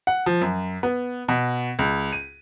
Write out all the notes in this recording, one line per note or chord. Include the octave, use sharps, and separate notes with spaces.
F#5
F3
F#2
B3
B2
C#2
D#7